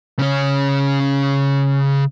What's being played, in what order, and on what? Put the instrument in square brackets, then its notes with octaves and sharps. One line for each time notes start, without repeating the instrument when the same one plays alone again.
[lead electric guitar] C#3 C#4